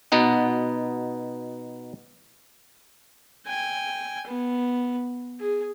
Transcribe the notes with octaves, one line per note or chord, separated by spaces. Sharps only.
B2 B3 D#4 F#5
G5 G#5
B3
G#4